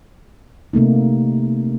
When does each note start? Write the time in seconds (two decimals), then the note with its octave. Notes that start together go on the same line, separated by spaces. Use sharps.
0.73 C3 A3 A#3 D#4